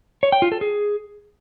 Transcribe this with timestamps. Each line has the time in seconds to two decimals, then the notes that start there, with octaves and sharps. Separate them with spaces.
0.23 C#5
0.32 G5
0.42 F4
0.52 A4
0.61 G#4